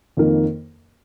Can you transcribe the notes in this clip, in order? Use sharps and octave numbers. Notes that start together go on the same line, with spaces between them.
F2 D#3 A#3 D#4 A#4